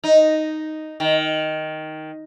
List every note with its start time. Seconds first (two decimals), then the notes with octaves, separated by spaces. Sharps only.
0.04 D#4
1.00 D#3